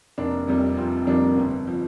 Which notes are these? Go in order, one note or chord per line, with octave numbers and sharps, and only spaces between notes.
F1 A#3 D4
F2 C3 G3
F1 C4 F4
F2 C3 G3 A#3 D4
G1 C4
F3